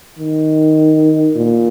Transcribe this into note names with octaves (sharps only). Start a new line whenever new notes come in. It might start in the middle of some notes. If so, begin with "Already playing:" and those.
D#3
A#2